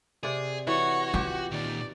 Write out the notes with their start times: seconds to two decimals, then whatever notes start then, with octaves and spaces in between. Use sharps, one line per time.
0.23 C3 G#4 D5
0.67 E3 F#4 C#5
1.14 F4 G4
1.51 A#2 D#3 D5